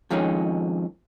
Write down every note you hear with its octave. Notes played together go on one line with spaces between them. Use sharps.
F2 D#3 F3 G#3 C#4